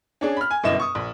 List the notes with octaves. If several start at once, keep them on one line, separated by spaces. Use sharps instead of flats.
C#4 D4 G#4
B5 F6
G#5
G1 F#2 B2 E4 D#5 E7
C#6 D#6
A#1